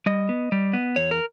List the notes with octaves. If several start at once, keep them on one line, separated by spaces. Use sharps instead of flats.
G3 D#5
B3
G3
B3
E2 C#5
A#4